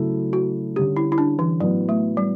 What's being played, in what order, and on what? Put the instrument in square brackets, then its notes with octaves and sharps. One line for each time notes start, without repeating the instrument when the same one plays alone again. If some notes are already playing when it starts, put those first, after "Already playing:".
Already playing: [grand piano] C#3 F#3 A3 E4 A4
[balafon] F#4
[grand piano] D3 G3 C#4 [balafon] G4
[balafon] E4
E4
D4
E3
[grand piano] A2 E3 B3 F#4 B4 [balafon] F#3
[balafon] A3
G3